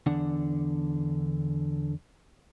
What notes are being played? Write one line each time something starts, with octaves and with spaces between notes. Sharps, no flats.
E2 D3 D4 F#5